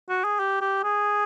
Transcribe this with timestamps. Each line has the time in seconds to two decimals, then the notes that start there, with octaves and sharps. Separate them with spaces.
0.09 F#4
0.24 G#4
0.39 G4
0.61 G4
0.83 G#4